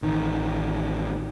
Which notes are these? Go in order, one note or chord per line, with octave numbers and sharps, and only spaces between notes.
A1 D#3